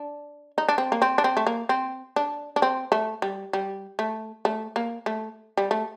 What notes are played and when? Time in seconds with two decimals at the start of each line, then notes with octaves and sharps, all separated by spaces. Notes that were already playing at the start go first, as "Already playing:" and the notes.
Already playing: D4
0.58 D#4
0.69 D4
0.78 C4
0.92 A#3
1.02 C4
1.18 D4
1.24 C4
1.37 A3
1.47 A#3
1.69 C4
2.16 D4
2.56 D4
2.62 C4
2.92 A3
3.22 G3
3.53 G3
3.99 A3
4.45 A3
4.76 A#3
5.06 A3
5.57 G3
5.71 A3